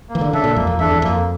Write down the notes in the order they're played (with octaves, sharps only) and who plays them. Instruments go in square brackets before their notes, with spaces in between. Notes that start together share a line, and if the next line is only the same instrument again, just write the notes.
[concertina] A#3
[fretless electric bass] E3
D3
[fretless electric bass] C#3 [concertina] D4 A4 E5
[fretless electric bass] A#2
[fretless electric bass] F2 [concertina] A#3
[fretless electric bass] F2
[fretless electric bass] E2 [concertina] D4 A4 E5
[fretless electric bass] E2
[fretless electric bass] F2 [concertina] A#3